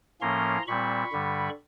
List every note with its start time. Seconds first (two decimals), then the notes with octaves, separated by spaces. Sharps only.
0.21 A2 F3 A#3 C#4 A#5 C6
0.67 A#2 G3 C4 B5 C#6
1.12 G2 D3 G3